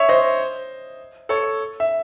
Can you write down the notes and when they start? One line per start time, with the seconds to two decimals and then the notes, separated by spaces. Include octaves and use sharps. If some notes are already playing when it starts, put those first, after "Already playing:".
Already playing: C#5 E5
0.09 C5 D#5
1.29 A4 C#5
1.80 E5